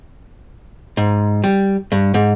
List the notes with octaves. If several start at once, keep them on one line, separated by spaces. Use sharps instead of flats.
G#2
G3
G2
G#2